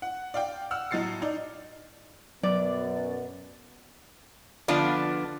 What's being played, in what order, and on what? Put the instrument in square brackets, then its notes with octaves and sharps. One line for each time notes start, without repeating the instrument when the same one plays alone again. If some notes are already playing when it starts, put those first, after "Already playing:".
[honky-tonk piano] F#5
D5 F5 G5
F#5 E6 F6
A2 F#3 D#5 A6 C7 C#7
D#4 D5
[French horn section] F#2 B2 B3 [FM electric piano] F#3 A6 [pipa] D5
[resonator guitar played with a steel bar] D3 F3 B3 D4 F4 D5